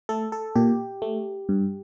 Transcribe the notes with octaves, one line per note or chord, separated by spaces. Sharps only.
A3 A4
A4
A#2 G4
A3
G2